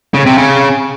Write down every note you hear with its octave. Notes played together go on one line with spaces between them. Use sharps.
C#3
C3
C#3